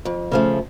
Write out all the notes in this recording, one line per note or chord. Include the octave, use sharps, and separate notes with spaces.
F2
C#3 F3 A3